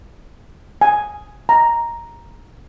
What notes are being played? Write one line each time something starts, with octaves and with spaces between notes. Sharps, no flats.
G#5
A#5